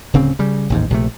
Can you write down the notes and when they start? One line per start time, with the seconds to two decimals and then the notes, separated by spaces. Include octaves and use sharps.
0.13 D1 C#3 C4
0.39 C#3 G3
0.70 A1 D#2 G#2
0.90 A#1 C3 A3